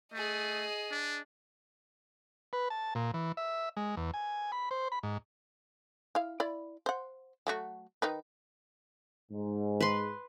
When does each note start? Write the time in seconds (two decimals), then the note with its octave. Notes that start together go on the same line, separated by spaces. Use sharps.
0.13 A3 G#4 D#5
0.91 D4
2.53 B4
2.70 A5
2.95 A#2
3.14 E3
3.37 E5
3.77 G#3
3.97 E2
4.14 G#5
4.52 B5
4.71 C5
4.92 B5
5.03 G#2
6.15 E4 F5
6.40 E4 D5 B5
6.86 C5 F#5
7.47 F#3 A3 F#4
8.02 D#3 D#4 B4
9.30 G#2
9.81 B4 C6